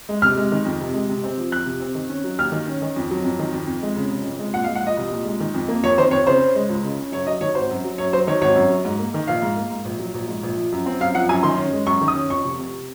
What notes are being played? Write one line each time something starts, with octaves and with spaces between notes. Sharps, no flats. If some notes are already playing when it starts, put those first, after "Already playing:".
G#3
C3 F6
G#3
D#3
F2
C3
G#3
C3
C4
F3
F2 F#6
C3
C4
D#3
C#4
F#3
D#2 F6
D#3
C#4
D#3
F2
F#3
F2
D#3
F2
F2
G#3
C#3
F1
F2
G#3
A#2 F#5
F5
G#3
F#5
F3 D#5
C2
A#2
G#3
D#3
F2
A#3
F2 C#5
D#3 C5
F2 C#5
C#3 C5
C#4
G#3
C#2
C#3
C#4
F#2 C#5
F#3 D#5
D#3 C#5
G#1 C5
F#2
F#3
F#2 C#5
F#3 C5
D#3 C#5
G#1 C#5
F#2
F#3
G#2
A#3
D#3
A#1 F5
G#2
A#3
G#2
A#1
F#3
A#1
G#2
A#1
F3
F#2
C4
F#2 F5
F3 F#5
F#2 G#5
D#3 C6
C#4
G#3
F#2 C#6
D#3
D#6
C#4
F2 C#6
F1
C3